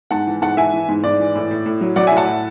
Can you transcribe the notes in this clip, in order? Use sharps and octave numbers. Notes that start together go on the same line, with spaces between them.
G#2 F#5 A5
E3
G#2 F#5 A5
E3 E5 G#5
E3
G#2
G#2 D5
E3
A2
A2
A2
F#3
F#3 D5 F#5
E5 G#5
A2
F#5 A5
A2